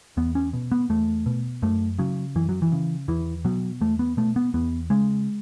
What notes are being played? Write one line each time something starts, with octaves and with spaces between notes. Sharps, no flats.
E2 B3
C#4
B2
B3
E2 A3
B2
F#2 A3
C#3 F#3
F#2 E3
F#3
E3
C#3
E2 E3
B2 F#3
E2 A3
B3
B2 A3
B3
E2 B3
C#3 G#3